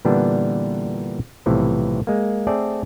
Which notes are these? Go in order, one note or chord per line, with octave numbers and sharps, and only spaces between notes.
A#2 D3 E3 G3 B3 D4
B1 A2 C3 E3 F3
G#3 A#3
A3 C4 G#4 A4 D5